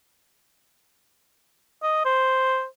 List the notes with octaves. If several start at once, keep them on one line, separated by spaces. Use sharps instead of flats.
D#5
C5